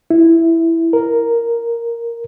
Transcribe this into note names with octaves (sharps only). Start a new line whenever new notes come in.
E4
A#4